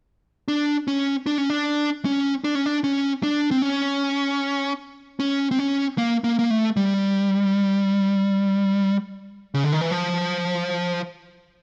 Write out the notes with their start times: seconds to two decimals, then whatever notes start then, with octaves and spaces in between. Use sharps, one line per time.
0.48 D4
0.88 C#4
1.26 D4
1.38 C#4
1.50 D4
2.05 C#4
2.44 D4
2.55 C#4
2.66 D4
2.84 C#4
3.23 D4
3.51 C4
3.62 C#4
5.20 C#4
5.51 C4
5.59 C#4
5.98 A#3
6.24 A#3
6.39 A#3
6.50 A3
6.77 G3
9.54 C#3
9.64 D3
9.73 D#3
9.81 E3
9.91 F3